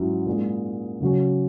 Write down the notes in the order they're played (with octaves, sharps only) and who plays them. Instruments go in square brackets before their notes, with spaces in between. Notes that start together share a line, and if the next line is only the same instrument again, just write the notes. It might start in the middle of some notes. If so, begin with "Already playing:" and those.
Already playing: [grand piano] G#2 F#3 C#4 E4
A#2 G#3 D#4
C#3 F#3 C#4